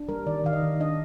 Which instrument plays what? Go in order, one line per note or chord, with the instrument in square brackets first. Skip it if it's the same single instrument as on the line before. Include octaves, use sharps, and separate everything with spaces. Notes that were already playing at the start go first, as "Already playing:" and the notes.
Already playing: [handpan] D4
G3 A#4
D#3 D5
D#3 F5
D#5
D#3
D4 D#5